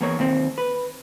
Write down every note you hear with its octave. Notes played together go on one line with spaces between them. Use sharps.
E2 A#3 C#5
D#2 C4
B4